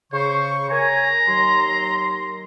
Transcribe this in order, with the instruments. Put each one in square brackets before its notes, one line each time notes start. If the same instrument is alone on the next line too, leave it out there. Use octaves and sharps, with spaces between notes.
[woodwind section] C#3 C#6 [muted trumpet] C5
[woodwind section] A#4 C#5 G#5 [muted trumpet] A#5
[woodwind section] D#2 F#3 C6